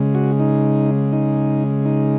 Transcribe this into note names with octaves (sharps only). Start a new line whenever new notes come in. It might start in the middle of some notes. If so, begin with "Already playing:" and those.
Already playing: C#3 G#3
F#4
D#4
D#4
D#4